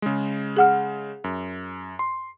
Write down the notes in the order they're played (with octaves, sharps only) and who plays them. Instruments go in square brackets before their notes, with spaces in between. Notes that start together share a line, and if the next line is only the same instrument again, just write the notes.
[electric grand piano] C#3 G#3
[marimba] G#4 F#5 F6
[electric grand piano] F#2
C6